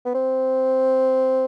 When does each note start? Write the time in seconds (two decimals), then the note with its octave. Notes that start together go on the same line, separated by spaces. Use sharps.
0.05 B3
0.14 C4